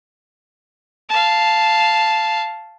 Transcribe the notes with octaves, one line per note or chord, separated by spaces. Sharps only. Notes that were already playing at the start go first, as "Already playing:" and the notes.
F5 A5